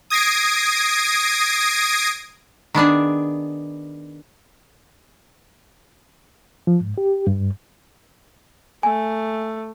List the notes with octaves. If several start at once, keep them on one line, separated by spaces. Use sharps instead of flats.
D#6 G#6 A#6 C7 D7
D#3 B3 D4 G#4
F3
G#2
G4
G2
A3 G#5